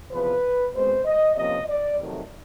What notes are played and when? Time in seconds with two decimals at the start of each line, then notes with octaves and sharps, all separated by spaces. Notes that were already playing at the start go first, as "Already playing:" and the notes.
0.12 E2 C3 F3 B4
0.74 B2 G#3 C4 C5
1.05 D#5
1.36 C3 F3 A#3 C#4 D#5
1.68 D5
1.99 F2 C3 D#3 F#3 A3